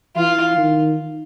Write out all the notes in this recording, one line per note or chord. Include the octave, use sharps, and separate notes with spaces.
E3 F4
D#3